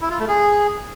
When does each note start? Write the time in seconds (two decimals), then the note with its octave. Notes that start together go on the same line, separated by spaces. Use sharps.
0.01 E4
0.10 F4
0.19 A3
0.28 G#4